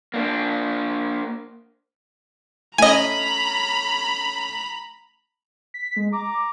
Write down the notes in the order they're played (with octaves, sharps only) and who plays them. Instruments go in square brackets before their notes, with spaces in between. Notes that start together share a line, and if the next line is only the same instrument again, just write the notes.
[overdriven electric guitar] A#3 D4
[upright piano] A3 C#4 [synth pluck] D#5 G#5 [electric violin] A#5 B5
[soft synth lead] B6
G#3
[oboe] A#5 [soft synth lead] D6